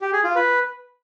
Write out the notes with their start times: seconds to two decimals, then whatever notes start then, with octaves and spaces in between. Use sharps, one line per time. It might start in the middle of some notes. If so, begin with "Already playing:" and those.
0.01 G4
0.13 G#4
0.24 F4
0.35 B4